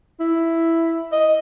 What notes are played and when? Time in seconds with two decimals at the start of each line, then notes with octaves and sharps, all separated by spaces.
0.20 E4
1.12 D#5